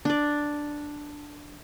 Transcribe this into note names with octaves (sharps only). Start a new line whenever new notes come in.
D4 D5